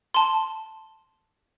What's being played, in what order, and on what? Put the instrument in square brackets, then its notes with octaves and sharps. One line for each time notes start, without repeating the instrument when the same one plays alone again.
[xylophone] A5 C6